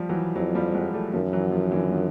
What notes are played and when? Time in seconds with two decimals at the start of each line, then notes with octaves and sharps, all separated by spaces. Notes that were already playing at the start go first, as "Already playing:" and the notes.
Already playing: F3 G3
0.09 E3 F#3
0.36 F2 E3 F#3
0.55 F3 G3
0.74 F#3 G#3
0.93 G3 A3
1.13 F#2 D#3 F3
1.32 E3 F#3
1.52 D#3 F3
1.72 D3 E3
1.91 D#3 F3